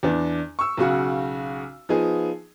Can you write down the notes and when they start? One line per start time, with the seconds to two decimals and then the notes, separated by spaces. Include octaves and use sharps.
0.03 E2 D4
0.59 C#6 E6
0.77 B1 C#3 F#4 F#5
1.89 F3 B3 D#4 G#4